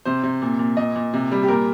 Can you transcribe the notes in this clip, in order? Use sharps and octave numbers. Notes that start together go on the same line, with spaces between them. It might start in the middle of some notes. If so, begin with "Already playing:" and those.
C3 C5
C3
A#2
A#2
A#2 D#5
A#2
C3
G3
G4
A#2 A#4